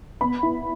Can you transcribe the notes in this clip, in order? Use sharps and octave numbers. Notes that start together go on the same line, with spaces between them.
B3 B5
E4